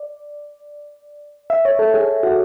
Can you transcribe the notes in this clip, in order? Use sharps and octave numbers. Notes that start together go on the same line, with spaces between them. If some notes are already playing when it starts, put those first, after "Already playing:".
Already playing: D5
E5
C#5
A4
G#4
F#4